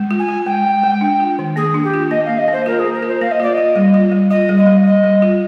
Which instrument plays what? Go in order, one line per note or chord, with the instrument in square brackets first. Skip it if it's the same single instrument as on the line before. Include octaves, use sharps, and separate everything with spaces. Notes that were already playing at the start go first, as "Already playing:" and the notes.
Already playing: [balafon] G#3
F4
[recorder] G#5
[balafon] F4
[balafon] G#3 [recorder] G5
[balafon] G#3
G#3
D4
F4
D#3
[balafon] A#3 [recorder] G#4
[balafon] D4
[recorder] G4
[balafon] F4
[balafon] A#3 [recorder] D#5
[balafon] A#3 [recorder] F5
[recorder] D#5
[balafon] A#3 [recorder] C5
[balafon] F4 [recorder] A#4
[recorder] G#4
[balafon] A#3
[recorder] A#4
[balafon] F4
[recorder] C5
[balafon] A#3 [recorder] F5
[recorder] D#5
[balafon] F4 [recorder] D5
[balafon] F4 [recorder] D#5
[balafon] G3
F4
G3
[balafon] F4 [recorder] D#5
[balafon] G3
[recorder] D#5
[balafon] G3
[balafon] G3 [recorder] D#5
[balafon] G3
F4